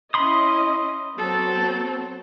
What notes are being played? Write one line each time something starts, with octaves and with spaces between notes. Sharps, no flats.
C#4 E4 D#5 B5 C6 D#6
F#3 B3 C4 A4